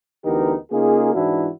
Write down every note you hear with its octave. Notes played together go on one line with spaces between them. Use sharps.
D2 E3 B3 D#4 G4 A#4
C#3 A#3 D#4 F4 G#4
G#2 E3 D4 E4 F#4